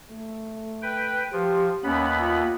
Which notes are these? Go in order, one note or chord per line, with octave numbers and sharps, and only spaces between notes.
A3
B4 G5
F3 G4
D#2 B3 C#4 B5
F4